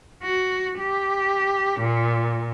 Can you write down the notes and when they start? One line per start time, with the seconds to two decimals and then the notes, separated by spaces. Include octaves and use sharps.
0.23 F#4
0.79 G4
1.80 A#2